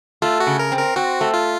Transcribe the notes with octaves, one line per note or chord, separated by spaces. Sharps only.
A3 F4
F#4
C#3
A#4
C4
A#4
C4 F#4
A3
F4